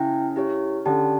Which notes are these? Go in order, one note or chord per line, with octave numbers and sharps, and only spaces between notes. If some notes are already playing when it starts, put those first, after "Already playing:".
Already playing: C#3 E4 G5
E4 G4 C#5
D3 C#4 G4 D5 A5